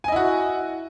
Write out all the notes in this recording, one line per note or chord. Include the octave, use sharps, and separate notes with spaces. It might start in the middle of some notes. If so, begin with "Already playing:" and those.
E4 F#4 D#5 G#5